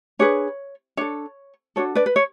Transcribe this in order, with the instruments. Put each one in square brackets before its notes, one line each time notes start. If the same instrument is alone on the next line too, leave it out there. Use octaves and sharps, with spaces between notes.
[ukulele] D4 G#4 B4 C#5
D4 A4 C#5
D4 F#4 A4 C#5
B4 D5
B4
C#5